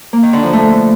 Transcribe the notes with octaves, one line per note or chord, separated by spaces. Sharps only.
A#3
D#3
D3
F3
A3